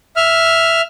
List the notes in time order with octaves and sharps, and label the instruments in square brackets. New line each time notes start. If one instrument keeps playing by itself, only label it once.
[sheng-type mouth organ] E5 F6